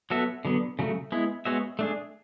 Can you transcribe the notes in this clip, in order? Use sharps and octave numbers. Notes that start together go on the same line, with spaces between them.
F#3 B3 F#4 A4 E5
D3 F#3 B3
C#3 F#3 A3
G#3 B3 E4
G#3 B3 F#4 C#5 E5
A3 D4 G#4